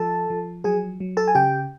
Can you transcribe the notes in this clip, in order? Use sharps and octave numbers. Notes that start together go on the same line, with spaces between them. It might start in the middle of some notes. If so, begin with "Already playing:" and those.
Already playing: F3 A4 A5
F3
F#3 G#4 G#5
F#3
A4 A5
G#5
C#3 G4 G5